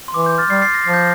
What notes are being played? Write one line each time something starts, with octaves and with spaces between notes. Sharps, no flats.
C6
E3 D6
G6
F6 A6
G3 A6 C7
A6 C7
A#6
F3 C7
G6 A#6